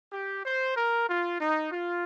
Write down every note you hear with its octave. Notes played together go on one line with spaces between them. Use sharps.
G4
C5
A#4
F4
D#4
F4